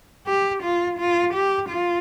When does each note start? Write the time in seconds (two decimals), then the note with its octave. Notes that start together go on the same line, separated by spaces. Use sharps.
0.27 G4
0.63 F4
0.99 F4
1.34 G4
1.69 F4